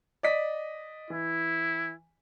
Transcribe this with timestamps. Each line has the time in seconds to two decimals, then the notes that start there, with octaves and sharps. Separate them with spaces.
0.23 D5 D#5 B6
1.10 E3 E4